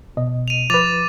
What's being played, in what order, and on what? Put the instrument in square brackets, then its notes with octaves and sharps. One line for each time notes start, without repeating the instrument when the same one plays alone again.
[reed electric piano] B2 D#5
[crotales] D#7 F7
[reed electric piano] F3 B4 [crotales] D6 A6 F7